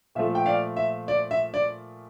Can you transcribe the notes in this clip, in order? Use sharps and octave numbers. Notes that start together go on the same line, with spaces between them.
A#2 F3 A3 E5
G5
D5 F5
E5
D5
E5
D5